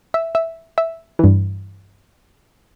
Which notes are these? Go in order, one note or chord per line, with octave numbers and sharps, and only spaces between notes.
E5
E5
E5
G2 E3